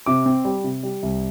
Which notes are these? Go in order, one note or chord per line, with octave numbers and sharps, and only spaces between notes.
C3 D6
C4
G3
C3
G3
C2